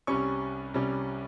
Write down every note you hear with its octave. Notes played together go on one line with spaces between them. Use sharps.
C2 C3 G3 C#4 C#6
C2 C3 G3 C#4